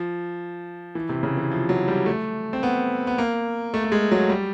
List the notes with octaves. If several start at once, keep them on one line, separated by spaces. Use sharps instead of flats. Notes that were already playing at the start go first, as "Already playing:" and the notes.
Already playing: F3
E3
C3
C#3
E3
F3
F#3
G3
A3
C4
B3
B3
A#3
A3
A3
G#3
F#3
G3